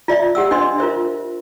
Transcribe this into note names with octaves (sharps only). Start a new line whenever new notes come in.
F4 D5 E5
G4 F#5 E6
D4 C5 D#5 C6
F4 A#4 C5 E5